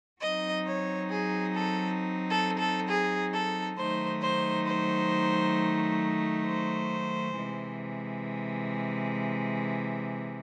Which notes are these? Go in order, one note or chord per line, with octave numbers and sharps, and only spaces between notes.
F#3 C4 D#4 D#5
C#5
G#4
A4
A4
A4
G#4
A4
D#3 F#3 A3 D#4 C5
C5
C5
C5
C3 E3 G#3